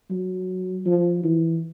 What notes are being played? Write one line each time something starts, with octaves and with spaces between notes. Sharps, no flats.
F#3
F3
E3